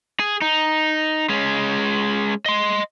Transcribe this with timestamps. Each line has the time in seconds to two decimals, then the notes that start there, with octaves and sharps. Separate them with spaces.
0.20 G#4
0.41 D#4
1.29 G#3 C#4
2.46 D#5 C6